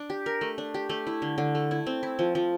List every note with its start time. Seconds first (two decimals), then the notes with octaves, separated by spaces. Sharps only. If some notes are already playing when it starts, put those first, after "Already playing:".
Already playing: D4
0.10 G4
0.26 A#4
0.41 A3
0.58 D4
0.74 G4
0.89 A3
1.07 E4
1.22 D3
1.38 D3
1.55 A3
1.71 E4
1.86 C4
2.03 E4
2.19 F3
2.35 F3